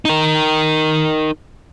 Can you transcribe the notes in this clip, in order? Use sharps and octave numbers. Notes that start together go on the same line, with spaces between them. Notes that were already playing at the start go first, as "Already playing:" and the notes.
D#4 A#4